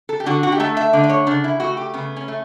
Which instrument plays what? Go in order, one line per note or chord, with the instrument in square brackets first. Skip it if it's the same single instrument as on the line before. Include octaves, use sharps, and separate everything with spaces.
[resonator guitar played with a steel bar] A4
G4
D3 F#4
F#4
G4
A3 A4
E5
D3 D5
D5
C#5
C#3 D4
E4
A3 F#4
G4
C#3 B3
C#4
A3